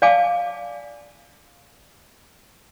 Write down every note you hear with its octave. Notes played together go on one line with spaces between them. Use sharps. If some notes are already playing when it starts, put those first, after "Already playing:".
D5 F5 G#5 A5 D6